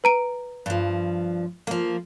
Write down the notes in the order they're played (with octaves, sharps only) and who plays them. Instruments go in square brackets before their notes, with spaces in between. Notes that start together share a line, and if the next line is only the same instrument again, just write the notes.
[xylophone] B4 A#5 D7
[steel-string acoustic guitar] G2 F3
F3 A#3